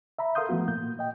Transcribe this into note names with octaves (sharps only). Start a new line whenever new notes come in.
E5 A#5 B5
A4 A#4 F5 C6 D#6 G6
E3 F3 A3 B3 F#4
A#2 A#3 G6
D#5 G5